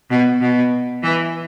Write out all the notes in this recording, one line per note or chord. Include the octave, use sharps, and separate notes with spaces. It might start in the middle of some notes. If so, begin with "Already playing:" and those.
B2
B2
E3